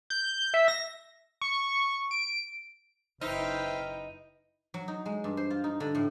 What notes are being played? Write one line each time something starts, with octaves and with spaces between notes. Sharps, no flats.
G6
E5
A#6
C#6
D7
F#1 D#4 E4 B4 C5 E5 G5 F6
F#3
D#4
G#3
G2
C5
F4
D#4
D3
A2